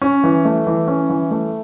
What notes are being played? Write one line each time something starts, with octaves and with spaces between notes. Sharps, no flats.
C#4
E3
A3
E3
C#4
E3
A3